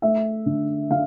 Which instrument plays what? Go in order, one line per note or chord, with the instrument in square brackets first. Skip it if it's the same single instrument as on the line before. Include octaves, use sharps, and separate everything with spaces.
[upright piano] A3 E5
D3
D3 F5